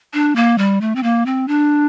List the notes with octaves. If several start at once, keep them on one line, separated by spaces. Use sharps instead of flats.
D4
A#3
G3
A3
C4
A#3
C4
D4